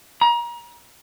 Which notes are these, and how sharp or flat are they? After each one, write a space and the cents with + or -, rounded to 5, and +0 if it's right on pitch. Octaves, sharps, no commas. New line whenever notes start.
A#5 +30